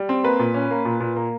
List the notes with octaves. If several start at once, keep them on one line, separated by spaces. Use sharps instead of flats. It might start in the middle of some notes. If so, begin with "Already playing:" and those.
Already playing: G3
C4
A#3 B4
A#2
C#4
A#3
A#2
A#2
A#3